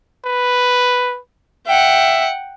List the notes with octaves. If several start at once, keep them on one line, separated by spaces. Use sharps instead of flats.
B4
E5 F#5 G5